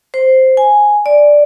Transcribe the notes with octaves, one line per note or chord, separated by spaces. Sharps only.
C5
G#5
D5